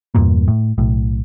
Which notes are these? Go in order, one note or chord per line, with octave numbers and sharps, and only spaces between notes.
E2 G2 A#2 A#3
A2
B1 A2